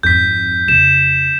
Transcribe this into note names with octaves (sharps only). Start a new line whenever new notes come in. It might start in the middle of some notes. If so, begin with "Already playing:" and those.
G#1 F2 G6 B6
F2 C#3 E7